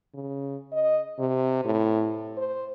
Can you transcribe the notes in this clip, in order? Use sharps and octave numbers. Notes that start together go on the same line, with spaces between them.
C#3
D#5
C3
A2
C5